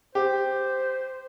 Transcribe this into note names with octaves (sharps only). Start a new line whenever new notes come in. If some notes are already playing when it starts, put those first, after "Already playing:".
G4 C5